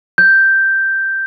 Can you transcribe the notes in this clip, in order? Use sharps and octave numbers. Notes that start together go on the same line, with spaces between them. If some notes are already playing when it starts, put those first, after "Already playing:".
G6